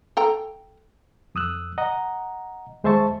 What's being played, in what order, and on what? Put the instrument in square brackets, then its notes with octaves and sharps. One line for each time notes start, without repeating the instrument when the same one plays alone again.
[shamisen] A4 G5 A#5
[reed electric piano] F2 D#6 E6 F#6
D#5 F#5 A#5
D#2 G#3 C5 E5 A5 C#6